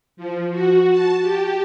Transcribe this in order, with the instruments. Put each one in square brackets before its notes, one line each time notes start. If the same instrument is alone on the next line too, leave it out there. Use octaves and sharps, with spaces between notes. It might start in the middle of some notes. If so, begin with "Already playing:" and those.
[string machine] F3
F#4
A5
G4